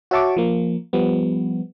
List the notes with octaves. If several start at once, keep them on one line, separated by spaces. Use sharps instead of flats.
F#4 C#5 E5 A5 C#6 D6
F3 A#3
F3 G3 B3